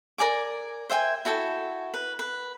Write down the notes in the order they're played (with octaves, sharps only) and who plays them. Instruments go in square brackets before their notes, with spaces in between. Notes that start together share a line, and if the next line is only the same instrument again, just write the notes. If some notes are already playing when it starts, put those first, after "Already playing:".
[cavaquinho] A#4 D5 G#5 D6
C5 E5 G5 G#5
E4 F#4 A4 G5
B4
B4